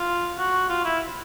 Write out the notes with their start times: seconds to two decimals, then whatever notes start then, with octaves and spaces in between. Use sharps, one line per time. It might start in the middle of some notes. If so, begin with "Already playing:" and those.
Already playing: F4
0.39 F#4
0.69 F4
0.85 E4